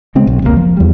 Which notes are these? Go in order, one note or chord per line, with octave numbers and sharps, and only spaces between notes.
C#3 G#3 C4
B1
F1 C#2 A#2 A#3
F3
E2 G3